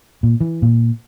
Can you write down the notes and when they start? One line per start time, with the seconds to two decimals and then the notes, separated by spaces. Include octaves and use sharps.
0.23 A#2
0.41 E3
0.62 A#2